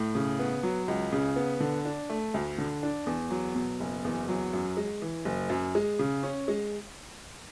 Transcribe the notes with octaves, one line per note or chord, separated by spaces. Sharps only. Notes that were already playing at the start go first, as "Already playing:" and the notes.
Already playing: A2
C#3
B3
F#3
C#2
C#3
B3
D3
D4
A3
D2
D3
D4
E2
F#3
B2
F#1
E2
F#3
F#2
G#3
E3
F#1
F#2
G#3
C#3
C#4
G#3